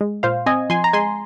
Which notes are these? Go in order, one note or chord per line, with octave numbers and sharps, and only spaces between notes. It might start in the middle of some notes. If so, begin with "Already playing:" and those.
G#3
A#2 C5 F5
C4 D#5 G#5
F3 G#5 C6
A#5
G#3 G#5 C6